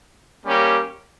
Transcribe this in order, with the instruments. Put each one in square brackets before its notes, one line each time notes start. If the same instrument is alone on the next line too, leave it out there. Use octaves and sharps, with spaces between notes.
[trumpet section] G3 A#3 C#4 G4